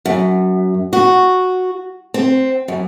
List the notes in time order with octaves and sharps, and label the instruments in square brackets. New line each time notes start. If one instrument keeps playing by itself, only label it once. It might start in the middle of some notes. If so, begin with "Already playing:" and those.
[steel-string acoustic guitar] F#2
F#4
C4
F#2